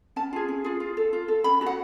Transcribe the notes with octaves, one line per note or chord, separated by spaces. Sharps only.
C#4 A5
F4 G#4
C#4
F4 G#4
F4
A4
F4
A4
C#4 B5
F#4 A4
F#5